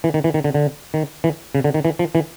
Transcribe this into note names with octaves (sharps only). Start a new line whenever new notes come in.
E3
D#3
E3
D#3
D3
D3
D#3
E3
C#3
D3
D#3
E3
F3
E3